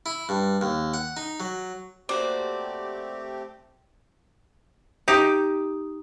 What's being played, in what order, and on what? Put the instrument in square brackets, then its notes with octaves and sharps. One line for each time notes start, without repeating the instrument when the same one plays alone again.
[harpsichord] E4
G2
D#2
F#5
D#4
F#3
[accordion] A3 C4 G4 [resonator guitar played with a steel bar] A#3 F#4 C5 [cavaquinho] D5
[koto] D#4 G4